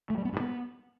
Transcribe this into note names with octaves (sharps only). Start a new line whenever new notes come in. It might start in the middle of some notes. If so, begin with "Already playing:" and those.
A3
G3
B3
G2
B3